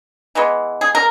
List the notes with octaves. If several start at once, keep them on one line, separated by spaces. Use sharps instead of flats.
E3 G#3 B3
G#4
A#4